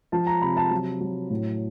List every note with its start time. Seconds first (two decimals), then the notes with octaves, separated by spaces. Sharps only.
0.12 F3 A5
0.27 A#5
0.42 C3 B5
0.57 A5
0.71 F#3
1.01 F#3
1.30 A2